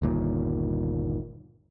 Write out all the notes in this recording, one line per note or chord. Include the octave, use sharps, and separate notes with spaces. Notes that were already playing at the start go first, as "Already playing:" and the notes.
G1 D#2 A#2